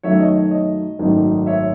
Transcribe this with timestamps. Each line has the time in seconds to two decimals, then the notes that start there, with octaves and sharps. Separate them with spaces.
0.03 F#2 D#3 F#3 A3 C#5 E5
0.20 D#5
0.36 C#5
0.51 D#5
0.99 G#1 F#2 D#3 A3 D#4
1.46 C#5 E5